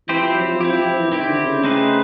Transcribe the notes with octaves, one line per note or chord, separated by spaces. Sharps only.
E3 C4 E4 G4 C5
F3
F#3
F3
F3 C4 E4 G4
F3
F3
E3
D#3 C4 E4 G4
D3
C#3
A3 C4 D#4 G#4 B4